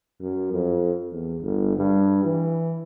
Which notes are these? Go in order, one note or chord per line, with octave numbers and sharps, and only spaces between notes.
F#2
F2
E2
G1
G2
E3